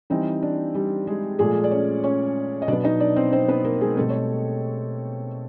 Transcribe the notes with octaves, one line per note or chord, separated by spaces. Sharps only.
E3 G3 C4 D#4
D4
G3 G4
G#3 G#4
A#2 F3 G#3 A3 G#4
D5
C#4 C#5
C#4 C#5
D#5
B2 F#3 B3 D4 D5
D#4 D#5
D4 D5
C4 C5
C4 C5
B3 B4
A#3 A#4
G#3 G#4
B2 G3 A3 C4 A4
C#5